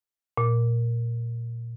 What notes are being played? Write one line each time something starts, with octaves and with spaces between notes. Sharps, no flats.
A#2